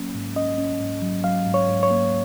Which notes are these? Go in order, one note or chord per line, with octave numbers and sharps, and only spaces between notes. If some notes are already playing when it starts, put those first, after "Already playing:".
Already playing: F#3 A#3 C#4
G#2
C#4 D#5
C#4
G#2
F#3
F#3 F5
G#2
C#5
G#2
C#5
A#3